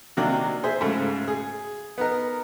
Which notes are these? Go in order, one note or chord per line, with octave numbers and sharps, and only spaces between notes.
C3 D#3 F#3 A#3 D4
G#4 C5 E5
G#2 C#3 A3
G#4
B3 D#4 A#4